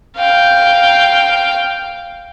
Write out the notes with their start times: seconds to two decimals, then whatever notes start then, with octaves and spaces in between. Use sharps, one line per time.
0.17 F5 G5